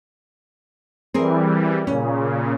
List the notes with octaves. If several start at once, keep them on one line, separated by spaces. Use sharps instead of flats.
E3 G3 C4 G#4 A#4
A#2 C#3 C#4